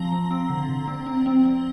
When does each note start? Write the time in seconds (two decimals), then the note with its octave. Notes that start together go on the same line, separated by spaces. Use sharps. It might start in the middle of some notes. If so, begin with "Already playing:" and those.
Already playing: F3 C4 A#5
0.12 F3
0.31 C4
0.50 D3
0.69 D3
0.87 C4
1.06 C4
1.26 C4
1.45 C4